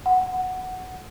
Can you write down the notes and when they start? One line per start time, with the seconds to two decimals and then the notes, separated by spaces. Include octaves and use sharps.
0.06 F#5